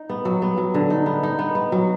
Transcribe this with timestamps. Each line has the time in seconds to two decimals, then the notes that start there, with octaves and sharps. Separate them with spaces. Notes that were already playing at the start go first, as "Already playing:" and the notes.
Already playing: D#4
0.09 B3
0.25 F#3
0.42 B3
0.57 F#3
0.74 D3
0.90 D#4
1.06 B3
1.23 D#4
1.39 B3
1.55 B3
1.72 F#3